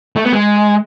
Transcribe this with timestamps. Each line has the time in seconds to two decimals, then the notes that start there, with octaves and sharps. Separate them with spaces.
0.16 A3
0.24 B3
0.33 G#3